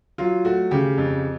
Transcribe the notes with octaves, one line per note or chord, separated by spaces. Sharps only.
F#3 F4
A3 F#4
C#3 G4
F2